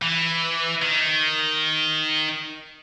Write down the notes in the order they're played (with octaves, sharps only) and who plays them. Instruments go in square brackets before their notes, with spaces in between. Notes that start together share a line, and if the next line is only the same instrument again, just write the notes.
[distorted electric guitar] E3
D#3